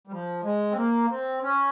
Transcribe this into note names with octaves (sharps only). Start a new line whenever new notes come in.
G3
F3
G#3
C4
A#3
C4
C#4